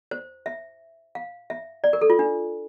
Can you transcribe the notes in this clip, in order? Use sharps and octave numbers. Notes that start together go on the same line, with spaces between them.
C5
E5
F5
E5
D5
A#4
A4
F4
D4